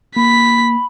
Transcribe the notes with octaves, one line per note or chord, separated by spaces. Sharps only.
A#3 B5 B6